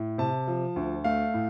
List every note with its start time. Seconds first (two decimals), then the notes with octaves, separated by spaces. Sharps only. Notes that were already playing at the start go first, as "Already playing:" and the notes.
Already playing: A2
0.18 C3 A5
0.48 F3
0.76 D2
1.04 A3 F5
1.34 A2